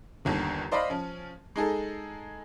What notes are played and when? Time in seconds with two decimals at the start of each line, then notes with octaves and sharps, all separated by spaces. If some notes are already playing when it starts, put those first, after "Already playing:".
0.25 G1 D#2 D3
0.72 C5 D5 D#5 F5 B5
0.90 F3 C#4
1.56 G#3 D#4 G#4 A4